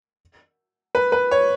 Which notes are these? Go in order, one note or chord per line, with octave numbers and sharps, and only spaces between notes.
B4
B4
C#5